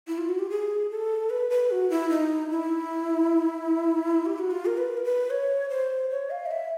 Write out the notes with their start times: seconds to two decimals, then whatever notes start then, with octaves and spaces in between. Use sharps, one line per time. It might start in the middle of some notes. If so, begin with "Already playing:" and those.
0.07 E4
0.18 F4
0.29 F#4
0.39 G4
0.50 G#4
0.90 A4
1.30 B4
1.50 B4
1.71 F#4
1.90 E4
2.10 D#4
2.50 E4
4.26 G4
4.38 F#4
4.51 F4
4.66 A#4
4.77 B4
4.97 A#4
5.04 B4
5.30 C#5
5.70 C5
6.10 C#5
6.30 F5
6.46 D#5
6.51 E5